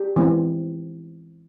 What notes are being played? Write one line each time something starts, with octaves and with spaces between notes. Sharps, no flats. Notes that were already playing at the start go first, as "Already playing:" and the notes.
Already playing: G4
E3 G#3 C4